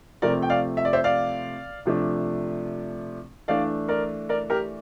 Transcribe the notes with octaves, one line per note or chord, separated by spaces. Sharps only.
C3 F3 A3 C4 A#4 D5
G5
D5 F5
E5
D5
C5 E5
D5 F5
C3 F3 A3 D4
E3 A3 D4 D5 F5
A#4 D5
A#4 D5
G4 A#4